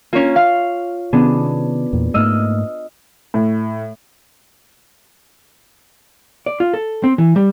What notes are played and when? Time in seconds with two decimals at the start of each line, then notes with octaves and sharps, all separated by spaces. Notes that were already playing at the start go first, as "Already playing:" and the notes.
0.13 A#3 C#4 F4 C#5
0.36 F5
1.13 C3 D#3 B3 C#4 D4 G#4
1.93 E2 A#2
2.14 G#2 A3 A#3 D#5 E6 F6
3.34 A2
6.46 D5
6.60 F4
6.74 A4
7.04 C4
7.18 E3
7.36 G3